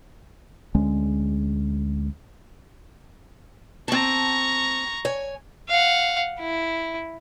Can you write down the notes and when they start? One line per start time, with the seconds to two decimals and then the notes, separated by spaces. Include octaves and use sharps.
0.75 D2 G#3 C#4
3.88 C4 A5 A#5 C#6
5.05 C#5 G#5
5.69 F5 F#5
6.40 E4